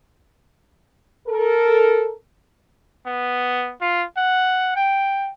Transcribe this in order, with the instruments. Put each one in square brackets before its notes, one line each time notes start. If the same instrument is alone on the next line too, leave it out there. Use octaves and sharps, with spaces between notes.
[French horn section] A4 A#4
[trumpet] B3
F4
F#5
G5